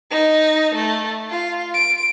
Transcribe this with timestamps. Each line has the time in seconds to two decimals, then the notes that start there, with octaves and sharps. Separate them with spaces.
0.11 D#4
0.75 A3
1.30 F4
1.74 D7